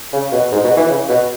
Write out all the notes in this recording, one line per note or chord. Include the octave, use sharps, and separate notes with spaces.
C#3
B2
G#2
B2
E3
C#3
B2